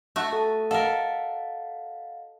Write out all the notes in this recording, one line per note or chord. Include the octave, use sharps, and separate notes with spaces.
A3 F#4
A4 A5
A4 A#4 D#5 F5 F#5